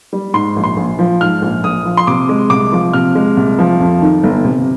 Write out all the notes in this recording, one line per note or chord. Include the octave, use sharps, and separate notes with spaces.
G3
G#2 C6
A#1
C6
A#1
F3
G#2 F6
A#1
A#1 D#6
F3
C6
C3 D6
G#3
C2 D6
F3
C3 F6
G#3
C2
F3
F2
D#3
G1
C3